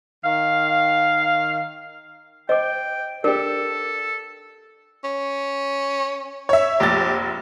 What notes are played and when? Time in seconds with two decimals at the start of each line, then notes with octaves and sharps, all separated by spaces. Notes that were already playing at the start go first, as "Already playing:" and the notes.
0.25 D#3 F5
2.49 C5 D#5 G5 D6
3.24 D4 G4 A4 A#4
5.04 C#4
6.49 C#5 E5
6.80 F1 A#1 G4 A6